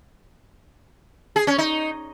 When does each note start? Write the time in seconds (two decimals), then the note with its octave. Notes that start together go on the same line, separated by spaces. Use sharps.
1.36 G#4
1.47 C#4
1.58 D#4